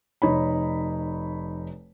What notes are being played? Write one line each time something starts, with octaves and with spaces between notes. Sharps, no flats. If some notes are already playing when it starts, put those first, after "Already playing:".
F1 D#4 C#5 B5